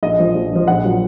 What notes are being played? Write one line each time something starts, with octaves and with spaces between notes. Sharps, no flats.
A#1 D#5
A#2 F3
A#1
A#2 F3
A#1 F#5
A#2 F#3